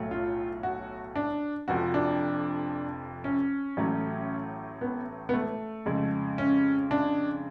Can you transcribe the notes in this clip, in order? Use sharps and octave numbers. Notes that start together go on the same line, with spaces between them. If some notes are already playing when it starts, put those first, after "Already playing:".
Already playing: B1 A2 F#3 A3
F4
F#4
D4
F1 F2 F3 F#4
D4
C#4
A1 A2 F#3 A3
B3
B3
A3
F2 C#3 G#3
C#4
D4